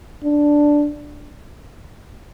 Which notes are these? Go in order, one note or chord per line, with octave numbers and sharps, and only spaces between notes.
D4